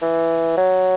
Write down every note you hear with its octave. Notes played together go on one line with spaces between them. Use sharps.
E3
F#3